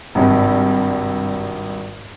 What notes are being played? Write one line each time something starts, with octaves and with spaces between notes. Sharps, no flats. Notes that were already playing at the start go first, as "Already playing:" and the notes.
G#1 G2 C3